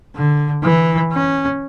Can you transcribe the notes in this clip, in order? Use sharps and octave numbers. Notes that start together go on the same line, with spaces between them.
D3
E3
C#4